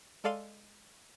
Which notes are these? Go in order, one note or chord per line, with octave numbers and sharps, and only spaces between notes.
G#3 A4 D5 F5 C6 D#7